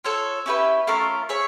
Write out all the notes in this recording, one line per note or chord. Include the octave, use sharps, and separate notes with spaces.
F4 A4 C#5
C#4 E4 G4 B4
A3 C#4 F4 A#4
G#4 C#5 E5